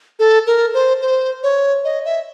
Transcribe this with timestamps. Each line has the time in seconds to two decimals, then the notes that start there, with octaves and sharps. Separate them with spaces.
0.19 A4
0.47 A#4
0.74 C5
1.01 C5
1.43 C#5
1.85 D#5
2.05 E5